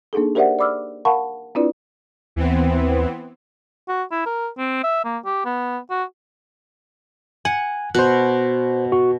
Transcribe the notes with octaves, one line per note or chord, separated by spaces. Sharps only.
A#3 D4 D#4 G#4 A4
G4 A#4 C5 D5 E5 F#5
D5 B5 D6 E6 F6
A#4 F5 F#5 A5 B5 C#6
C4 D4 E4 F4 B4 D5
D#2 E3 B3 C4
F#4
E4
A#4
C4
E5
A#3
G4
B3
F#4
F#5 G#5
B2 C5 F#6
F#4